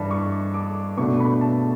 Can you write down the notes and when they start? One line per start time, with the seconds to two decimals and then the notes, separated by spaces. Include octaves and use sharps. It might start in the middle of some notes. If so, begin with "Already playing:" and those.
Already playing: G2 E3 D4 A5 B5
0.11 C#6
0.54 D6
0.97 B2 A3 D4 C#6
1.20 B5
1.41 A5